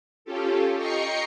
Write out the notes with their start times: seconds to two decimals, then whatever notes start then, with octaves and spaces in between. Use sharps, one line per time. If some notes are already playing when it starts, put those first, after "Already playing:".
0.25 C#4 F4 G4 A4
0.77 D#5 G5 A#5 C#6 C7 C#7